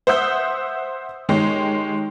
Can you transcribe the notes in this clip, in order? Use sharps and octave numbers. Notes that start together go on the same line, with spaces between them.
C5 E5 F#5 D#6 E6 G6
D#3 G#3 G4 C#5